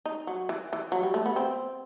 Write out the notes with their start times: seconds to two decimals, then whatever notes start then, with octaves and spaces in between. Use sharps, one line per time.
0.05 D#4
0.27 F#3
0.49 E3
0.73 E3
0.92 F#3
1.03 G3
1.14 A3
1.26 B3
1.36 C4